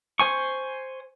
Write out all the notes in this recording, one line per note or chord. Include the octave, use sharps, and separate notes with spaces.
C5 G#5 C#6